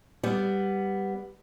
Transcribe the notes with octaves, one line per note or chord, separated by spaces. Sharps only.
G3 B3